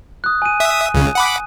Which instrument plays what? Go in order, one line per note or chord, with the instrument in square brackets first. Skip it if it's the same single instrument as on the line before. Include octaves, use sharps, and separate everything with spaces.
[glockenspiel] D#6 F#6
G#5 D#7
[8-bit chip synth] E5 D#6
C#2 C#3
F#5 B5 D6